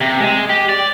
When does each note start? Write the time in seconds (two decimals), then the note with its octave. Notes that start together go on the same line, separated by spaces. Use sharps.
0.01 C3
0.20 G#3
0.50 G4
0.69 D5